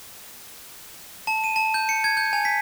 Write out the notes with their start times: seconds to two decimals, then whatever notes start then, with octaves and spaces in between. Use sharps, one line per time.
1.27 A5
1.44 D#7
1.56 A5
1.74 G6
1.89 C#7
2.04 G#6
2.17 G6
2.33 G#5
2.45 B6